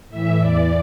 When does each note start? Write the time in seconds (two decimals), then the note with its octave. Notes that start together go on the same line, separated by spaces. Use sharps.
0.09 A2 E3 E5
0.40 E2 E3 D5